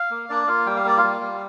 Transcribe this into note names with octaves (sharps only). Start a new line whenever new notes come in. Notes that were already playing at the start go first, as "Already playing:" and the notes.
Already playing: F5
A#3
A#3 D4 D5
A#3 F4 F5
G3 G5
F5
A#3 D5
F4 F5
G3
G3